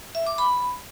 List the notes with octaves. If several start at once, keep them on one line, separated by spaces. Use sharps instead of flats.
E5
D6
B5